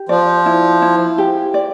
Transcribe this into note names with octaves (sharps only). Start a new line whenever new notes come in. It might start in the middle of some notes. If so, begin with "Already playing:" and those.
Already playing: G4
F3 D5
E4
E4
G4
D5